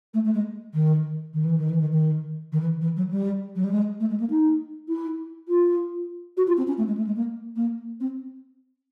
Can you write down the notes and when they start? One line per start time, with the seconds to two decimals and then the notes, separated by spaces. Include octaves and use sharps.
0.14 A3
0.25 A3
0.34 G#3
0.74 D#3
1.34 D#3
1.44 E3
1.57 D#3
1.69 E3
1.80 D#3
1.92 D#3
2.52 D#3
2.61 E3
2.81 E3
2.96 F#3
3.11 G3
3.55 F#3
3.64 G3
3.71 G#3
4.00 A3
4.10 G#3
4.20 A#3
4.30 D#4
4.89 E4
5.48 F4
6.37 F#4
6.47 F4
6.57 C4
6.67 C#4
6.77 A3
6.87 G#3
6.97 A3
7.06 G#3
7.16 A#3
7.56 A#3
8.00 C4